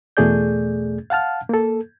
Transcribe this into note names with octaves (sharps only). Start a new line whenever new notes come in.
E2 B2 A3 G#4 D5 G6
F5 F#5 A5 F6
A#3 A4